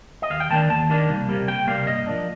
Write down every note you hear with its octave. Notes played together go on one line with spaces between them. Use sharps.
D#5
D#2 F5
G5
D#3 A#3 D4 A5
D#2 A5
D#3 A#3 D4
C2
C3 G3 A#3
C2 G5
C3 G3 A#3 F5
G2 D#5
F3 A#3 D4